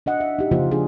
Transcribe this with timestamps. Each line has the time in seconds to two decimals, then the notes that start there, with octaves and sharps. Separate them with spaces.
0.06 D4 D#5 F#5
0.20 E5
0.39 D#4 G4
0.51 C#3 F3 A#3 F4 C5
0.71 D4 G#4